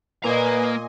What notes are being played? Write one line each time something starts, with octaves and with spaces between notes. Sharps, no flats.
A#2 A#3 B4 D#5 G#5 A#5